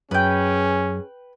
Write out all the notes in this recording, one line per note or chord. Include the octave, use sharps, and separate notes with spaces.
F#2 C#4 G#4 B4 G5